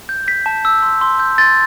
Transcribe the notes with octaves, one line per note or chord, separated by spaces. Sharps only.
G6
G6 B6
A5
E6
C6
C6
G6
C6 A6